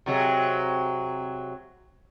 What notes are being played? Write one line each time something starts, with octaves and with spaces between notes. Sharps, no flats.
C3 F#3 G#3